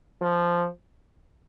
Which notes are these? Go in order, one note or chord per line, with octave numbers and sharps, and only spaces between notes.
F3